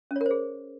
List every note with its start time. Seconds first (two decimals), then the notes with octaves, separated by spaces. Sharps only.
0.11 C#4
0.16 C#5
0.21 A#4
0.26 C5
0.31 G#4